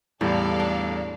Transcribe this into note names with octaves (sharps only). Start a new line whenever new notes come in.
E2 A2 G3 A4 D5 F5
D4